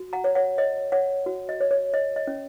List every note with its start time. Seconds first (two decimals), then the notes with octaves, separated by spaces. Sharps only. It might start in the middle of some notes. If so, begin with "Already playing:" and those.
Already playing: F#4
0.13 F#5 A#5
0.24 C#5
0.35 C#5 F#5
0.58 C#5 D#5
0.92 C#5 F#5
1.26 F#4
1.49 D#5
1.60 C#5
1.71 C#5
1.94 C#5 D#5
2.16 D#5
2.27 C#4